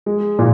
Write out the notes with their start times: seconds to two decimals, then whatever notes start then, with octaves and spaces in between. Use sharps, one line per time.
0.06 G#3
0.39 A#2